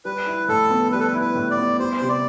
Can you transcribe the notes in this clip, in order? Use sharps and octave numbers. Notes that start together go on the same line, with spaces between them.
G3 B4
E4
A2 A4
B3
G3 B4
A4
B4
E4
B4
A2
D5
B3
G3 C5
C3 C5
D5